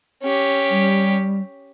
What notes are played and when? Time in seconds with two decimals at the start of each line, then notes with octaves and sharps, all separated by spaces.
0.23 C#4 G4
0.70 G3